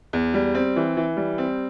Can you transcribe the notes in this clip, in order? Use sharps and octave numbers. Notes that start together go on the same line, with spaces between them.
E2
G3
C4
E3
E3
G3
C4